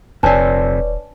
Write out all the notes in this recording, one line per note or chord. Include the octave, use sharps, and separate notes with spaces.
D#1 F2 C3 D4 B4 C#5 D5 A5